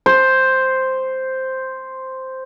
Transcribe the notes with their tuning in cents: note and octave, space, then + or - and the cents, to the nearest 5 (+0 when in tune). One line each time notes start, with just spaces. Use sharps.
C5 +0